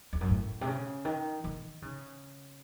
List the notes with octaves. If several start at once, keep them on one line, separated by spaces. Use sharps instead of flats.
F2
F#2
A2
C3
C#3
D#3
D#3
C#3